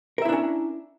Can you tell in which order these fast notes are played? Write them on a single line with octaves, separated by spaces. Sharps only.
A#4 E5 E4 D4 C#4